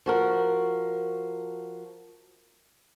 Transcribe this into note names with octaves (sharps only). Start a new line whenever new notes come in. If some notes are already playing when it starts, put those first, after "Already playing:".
F3 F#4 A#4